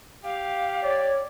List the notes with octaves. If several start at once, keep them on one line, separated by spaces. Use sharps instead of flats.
G4 F5
C#5 D5